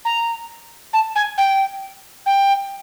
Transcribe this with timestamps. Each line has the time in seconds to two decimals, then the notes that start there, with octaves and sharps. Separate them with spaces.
0.05 A#5
0.93 A5
1.15 G#5
1.37 G5
2.26 G5